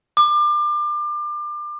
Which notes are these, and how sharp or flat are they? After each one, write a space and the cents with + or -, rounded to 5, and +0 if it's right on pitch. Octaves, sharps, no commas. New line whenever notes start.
D6 +30